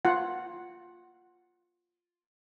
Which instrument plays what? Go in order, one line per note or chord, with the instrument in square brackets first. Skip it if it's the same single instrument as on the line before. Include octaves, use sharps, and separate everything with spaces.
[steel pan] F4 F#5